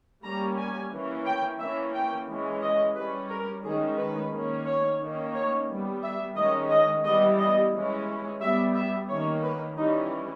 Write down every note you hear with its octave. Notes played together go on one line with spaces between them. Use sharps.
G3 A#3 C#4 A#5
G#5
E3 A#3 C#4
G5
E3 A#3 C#4 E5
G5
E3 G#3 C#4
D#5
G3 C#4 B4
A#4
D#3 G#3 C#4 G#4
B4
D#3 A#3 C#4
C#5
D#3 A#3 C#4
C#5
G3 B3
E5
D#3 G#3 C#4 D#5
D#5
E3 G3 B3 D#5
D#5
E3 G#3 C#4
G3 B3 E5
E5
D#3 A#3 C#4 C#5
B4
E3 G3 C#4 D#4